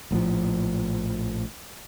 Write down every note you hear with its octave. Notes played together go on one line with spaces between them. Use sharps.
A#1 A2 D3 F3